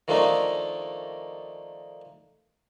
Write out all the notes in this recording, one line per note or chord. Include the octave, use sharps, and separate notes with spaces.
D#3 F3 A3 A#3 D4 D#4